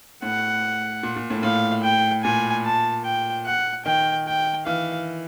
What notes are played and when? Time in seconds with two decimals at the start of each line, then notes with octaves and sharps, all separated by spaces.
0.22 A2 F#5
1.03 A#2
1.16 A#2
1.30 A2
1.43 A2 F5
1.84 G5
2.24 A#2 G#5
2.65 A5
3.04 G5
3.45 F#5
3.85 D#3 G5
4.26 G5
4.66 E3 F5